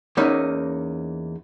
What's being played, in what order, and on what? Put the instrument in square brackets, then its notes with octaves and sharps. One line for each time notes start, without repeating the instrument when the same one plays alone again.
[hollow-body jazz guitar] E2 A#3 C#4 D#4 E5